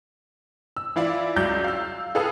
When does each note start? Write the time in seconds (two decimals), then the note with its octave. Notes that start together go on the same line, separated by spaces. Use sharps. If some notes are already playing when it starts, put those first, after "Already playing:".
0.77 E6
0.96 E3 E4 F4 D5
1.36 C#2 F#2 F#3 D5 G6
1.64 F5 E6
2.15 G#4 A4 B4 F5 D#6 E6